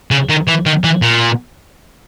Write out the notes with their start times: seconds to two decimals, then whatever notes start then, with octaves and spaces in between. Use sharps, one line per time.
0.11 C#3
0.29 D#3
0.47 E3
0.66 D#3
0.84 E3
1.02 A#2